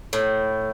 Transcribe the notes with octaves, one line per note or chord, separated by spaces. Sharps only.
A2